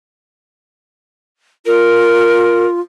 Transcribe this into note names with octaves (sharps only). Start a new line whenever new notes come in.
F4 A#4